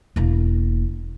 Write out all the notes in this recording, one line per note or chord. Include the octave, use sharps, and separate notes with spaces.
E1 A#3